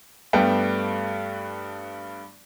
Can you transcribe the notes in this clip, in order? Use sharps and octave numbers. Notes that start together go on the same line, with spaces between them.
G2 G3 A3 B3 G5